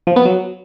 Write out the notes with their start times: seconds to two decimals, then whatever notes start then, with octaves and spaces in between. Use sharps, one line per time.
0.07 F3
0.16 B3
0.25 F#3